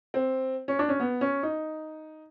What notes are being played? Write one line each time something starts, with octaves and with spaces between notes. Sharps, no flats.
C4
C#4
D4
C#4
B3
C#4
D#4